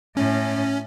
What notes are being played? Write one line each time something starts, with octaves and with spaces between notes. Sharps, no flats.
A2 C#4